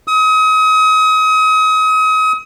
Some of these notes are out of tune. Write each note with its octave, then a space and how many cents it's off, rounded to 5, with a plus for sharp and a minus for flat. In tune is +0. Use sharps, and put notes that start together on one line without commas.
D#6 +35